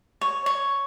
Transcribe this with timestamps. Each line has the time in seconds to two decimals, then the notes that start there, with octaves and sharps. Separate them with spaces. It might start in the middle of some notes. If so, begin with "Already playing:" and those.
0.21 C#5
0.46 C#5